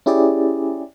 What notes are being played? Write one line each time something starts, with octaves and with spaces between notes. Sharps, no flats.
C#4 E4 G4 G#4 D5